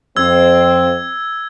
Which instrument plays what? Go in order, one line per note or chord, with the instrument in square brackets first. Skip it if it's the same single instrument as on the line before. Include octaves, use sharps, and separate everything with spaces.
[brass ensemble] F2 C4 [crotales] E6 G#6